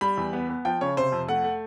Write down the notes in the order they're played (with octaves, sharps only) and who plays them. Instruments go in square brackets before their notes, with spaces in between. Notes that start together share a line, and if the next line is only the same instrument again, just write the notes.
[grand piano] G3 B5
E2
B3
B3
F3 G5
C#3 C#5
C3 C5
F2
A3 F#5
A3